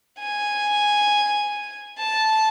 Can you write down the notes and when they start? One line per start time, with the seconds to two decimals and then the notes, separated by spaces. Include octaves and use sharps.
0.19 G#5
1.98 A5